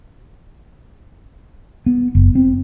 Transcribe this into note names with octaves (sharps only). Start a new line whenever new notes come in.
B3
F#1
C4